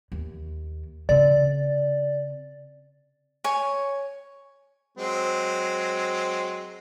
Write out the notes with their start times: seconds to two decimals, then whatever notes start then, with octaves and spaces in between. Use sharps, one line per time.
0.12 D#2
1.09 C#3 C4 D5
3.44 C#5 G#5
4.98 F#3 G#3 C4